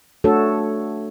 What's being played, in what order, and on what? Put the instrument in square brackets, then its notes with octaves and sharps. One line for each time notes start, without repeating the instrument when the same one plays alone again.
[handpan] A3 D4 F#4 A4 C#5